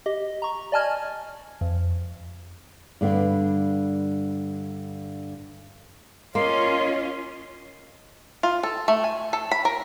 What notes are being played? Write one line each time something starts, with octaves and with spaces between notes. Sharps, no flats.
G4 D#5
A#5 C#6
D5 D#5 G#5 A5 F6 G#6
F2
G2 D3 B3
A#3 C#4 F4 D#5 C6
F4
A4
A3
G#5
A4
B5
A#4